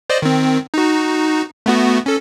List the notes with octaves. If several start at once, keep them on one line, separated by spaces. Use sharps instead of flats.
C5 D5 D#5
D#3 C4
D#4 F#4
A3 B3 F#4
C#4 A4